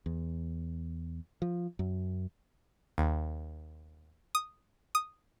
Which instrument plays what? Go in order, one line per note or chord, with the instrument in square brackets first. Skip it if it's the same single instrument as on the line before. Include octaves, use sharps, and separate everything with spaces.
[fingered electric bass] E2
F3
F#2
[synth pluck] D#2
D#6
D#6